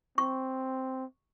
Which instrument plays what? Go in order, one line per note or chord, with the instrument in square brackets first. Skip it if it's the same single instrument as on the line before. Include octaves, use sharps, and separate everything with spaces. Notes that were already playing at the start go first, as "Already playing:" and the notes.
[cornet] C4 [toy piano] C#6